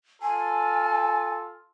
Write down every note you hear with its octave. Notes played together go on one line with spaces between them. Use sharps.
F4 A4 G#5